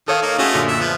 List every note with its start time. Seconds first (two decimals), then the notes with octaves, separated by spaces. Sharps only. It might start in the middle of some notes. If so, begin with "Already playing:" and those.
0.08 D#3 A4 C#5 F5 D#6
0.22 A#3 D#4
0.38 A3 C#4 F4 F#4 G#4 D#5
0.54 F#2 A#2 D3
0.68 E5
0.80 F3 B3